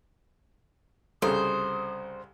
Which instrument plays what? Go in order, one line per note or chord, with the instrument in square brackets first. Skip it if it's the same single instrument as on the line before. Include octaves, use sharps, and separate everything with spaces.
[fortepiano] C2 C#3 [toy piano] A4 [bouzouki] C5 [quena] D#6